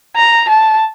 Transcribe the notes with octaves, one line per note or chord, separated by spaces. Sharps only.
A#5
A5